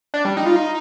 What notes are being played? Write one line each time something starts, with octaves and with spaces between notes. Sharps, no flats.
D4
G3
D#4
F4
D#4